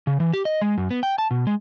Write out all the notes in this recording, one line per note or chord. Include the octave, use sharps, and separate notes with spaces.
C#3
E3
G4
D#5
G#3
F#2
B3
G5
A5
B2
G#3